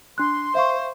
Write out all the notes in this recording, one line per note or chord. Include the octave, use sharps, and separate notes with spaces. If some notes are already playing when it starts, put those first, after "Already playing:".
D4 C6 F#6
C5 E5 F5 C#6